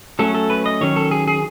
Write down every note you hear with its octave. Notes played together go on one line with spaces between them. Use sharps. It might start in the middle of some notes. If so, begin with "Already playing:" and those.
F#3 A3 C#4 A4
A4
B4
D#5
D#3 F#3 C#4 C#5
A4
G#4
G#4